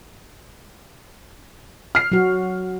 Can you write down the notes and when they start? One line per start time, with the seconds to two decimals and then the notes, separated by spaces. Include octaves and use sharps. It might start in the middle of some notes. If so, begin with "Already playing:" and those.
1.95 F6 C7
2.12 F#3 F#4